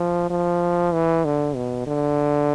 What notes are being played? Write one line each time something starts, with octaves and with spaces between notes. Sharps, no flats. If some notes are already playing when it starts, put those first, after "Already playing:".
Already playing: F3
F3
E3
D3
B2
D3